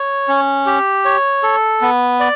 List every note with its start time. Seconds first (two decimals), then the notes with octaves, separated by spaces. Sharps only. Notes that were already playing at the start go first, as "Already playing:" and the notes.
Already playing: C#5
0.28 C#4
0.66 G4
1.05 C#5
1.43 A4
1.81 B3
2.20 D5